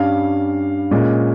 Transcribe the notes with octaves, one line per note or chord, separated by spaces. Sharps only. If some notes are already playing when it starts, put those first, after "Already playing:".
Already playing: G2 G3 C#4 F5
A#2 G#3 C#4